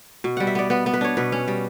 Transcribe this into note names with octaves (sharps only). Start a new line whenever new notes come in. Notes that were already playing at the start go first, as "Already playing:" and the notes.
B2
G3 F#5
E5
B3 D5
B3 B4
B3
B4
D4 C#5
B2 B4
C#4
G3